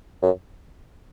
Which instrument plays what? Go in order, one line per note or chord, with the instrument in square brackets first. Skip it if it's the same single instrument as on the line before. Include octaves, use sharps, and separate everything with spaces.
[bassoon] F#2